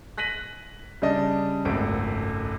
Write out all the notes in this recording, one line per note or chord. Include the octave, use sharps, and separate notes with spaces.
F#6 A#6 B6 D#7 F#7
C#3 G3 D4 D5 D#5 A5
G#1 C#2 F#2 A3 A4 D7